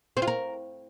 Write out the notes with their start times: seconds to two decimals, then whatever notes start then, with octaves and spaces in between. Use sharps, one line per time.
0.17 C4
0.22 F4
0.28 A#4